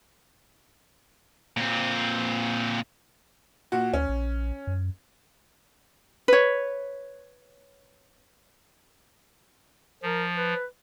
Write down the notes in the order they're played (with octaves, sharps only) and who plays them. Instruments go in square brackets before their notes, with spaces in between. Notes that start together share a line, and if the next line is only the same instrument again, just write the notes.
[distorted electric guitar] A#2 C4
[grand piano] A#2 F#4
[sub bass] D2 [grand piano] C#4
[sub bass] A#1
F#2
[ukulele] B4 C#5
[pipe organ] F3 [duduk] A#4
[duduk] B4